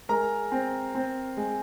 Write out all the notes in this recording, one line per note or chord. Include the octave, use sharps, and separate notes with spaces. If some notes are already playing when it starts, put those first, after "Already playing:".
G#3 A#4 A#5
C4
C4
G#3